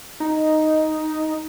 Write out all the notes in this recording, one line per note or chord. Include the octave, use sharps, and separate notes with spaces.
D#4